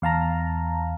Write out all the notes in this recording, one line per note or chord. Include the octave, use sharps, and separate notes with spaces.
E2 F5 A5 A#5